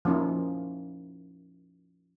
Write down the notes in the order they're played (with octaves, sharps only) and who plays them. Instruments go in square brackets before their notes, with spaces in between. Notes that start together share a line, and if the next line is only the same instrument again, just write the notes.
[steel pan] F3 A#3 C#4 D#4 E4